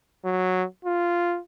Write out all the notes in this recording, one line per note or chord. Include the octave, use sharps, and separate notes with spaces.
F#3
F4